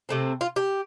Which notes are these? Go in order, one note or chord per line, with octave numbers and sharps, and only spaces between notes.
C3 A3 C4
F4
G4